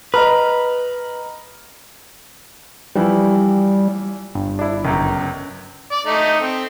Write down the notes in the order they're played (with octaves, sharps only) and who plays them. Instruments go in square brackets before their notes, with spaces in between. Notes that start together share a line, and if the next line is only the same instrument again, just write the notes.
[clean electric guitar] B4 [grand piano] D#5 A#5 F6
[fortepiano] E3 F3 [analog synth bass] G3
[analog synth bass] G1
[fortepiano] D4 E4
C#2 F#2
[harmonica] D5
A3 D#4
C4